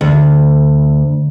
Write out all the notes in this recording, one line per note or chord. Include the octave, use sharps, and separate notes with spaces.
D2